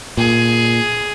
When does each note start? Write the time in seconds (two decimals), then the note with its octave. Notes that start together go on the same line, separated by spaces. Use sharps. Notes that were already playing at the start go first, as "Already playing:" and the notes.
0.17 A#2 G#4